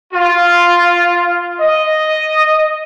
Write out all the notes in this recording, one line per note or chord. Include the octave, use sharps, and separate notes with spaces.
F4
D#5